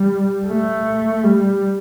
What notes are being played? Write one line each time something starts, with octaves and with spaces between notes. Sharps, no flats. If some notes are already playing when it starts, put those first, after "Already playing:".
Already playing: G3
A3
G3